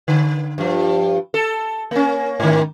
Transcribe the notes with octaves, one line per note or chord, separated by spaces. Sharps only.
D3
G2 F3
A4
A#3 C#4
G#2 D#3